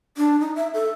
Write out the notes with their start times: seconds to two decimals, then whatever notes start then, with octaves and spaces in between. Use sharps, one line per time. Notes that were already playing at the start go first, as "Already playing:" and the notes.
0.17 D4
0.40 D#4
0.56 E5
0.74 A4